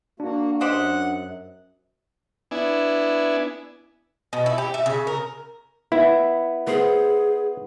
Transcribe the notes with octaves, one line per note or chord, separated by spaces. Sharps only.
A#3 D4 F#4
F#2 G4 C5 D#5 F#5
B3 D4 E4 G#5
B2
E4
G4
E5
C#3
A#4
B3 E4
B3 G#4 C5